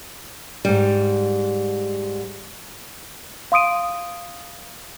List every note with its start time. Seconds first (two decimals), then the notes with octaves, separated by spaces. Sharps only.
0.65 G#2 G3
3.52 F5 C6 D#6 D7 D#7